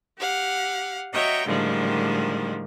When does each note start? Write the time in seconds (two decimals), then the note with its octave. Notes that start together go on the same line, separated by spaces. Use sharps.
0.17 G4 F5 F#5
1.14 F#4 C#5 D#5 E5 G5 A#5
1.47 A2 D3 D#3 F3 G3 G#3